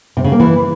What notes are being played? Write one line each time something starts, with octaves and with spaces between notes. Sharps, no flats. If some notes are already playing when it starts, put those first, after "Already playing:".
C3
C#3
A#3
E3